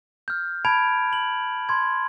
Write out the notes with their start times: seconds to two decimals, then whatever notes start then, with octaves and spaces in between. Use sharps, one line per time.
0.28 F6 G6
0.65 A5 B5 G#6 D7 F7
1.13 F#7
1.69 C6 G#6